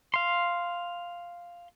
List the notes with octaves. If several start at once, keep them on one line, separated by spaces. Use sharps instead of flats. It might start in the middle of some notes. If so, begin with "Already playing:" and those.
F5 C6